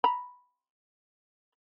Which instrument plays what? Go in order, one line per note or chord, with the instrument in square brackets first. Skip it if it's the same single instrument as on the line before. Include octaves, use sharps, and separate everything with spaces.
[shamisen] A#5 B5